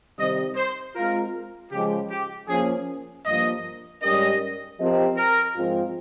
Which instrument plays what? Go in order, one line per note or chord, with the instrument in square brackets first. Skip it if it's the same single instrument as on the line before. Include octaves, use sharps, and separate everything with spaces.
[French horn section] C3 D#3 G3 C4 [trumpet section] D#5
[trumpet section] C5
[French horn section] G#3 C4 F4 [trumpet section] A#4
[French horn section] C#3 F3 G#3 [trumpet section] G4
[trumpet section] G4
[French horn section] F3 A#3 C#4 [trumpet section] G#4
[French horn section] G2 F3 A#3 F4 [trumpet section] D#5
[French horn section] G#2 G3 C#4 G4 A#4 [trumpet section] D#5
[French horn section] F3 C4 G4 A#4 D#5
[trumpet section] A#4
[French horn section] G#2 F3 G#3 C4 F4